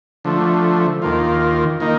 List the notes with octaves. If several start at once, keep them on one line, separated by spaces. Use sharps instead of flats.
D3 F3 A3
D#2 D#3 A#3 F4
D#3 A#3 D#4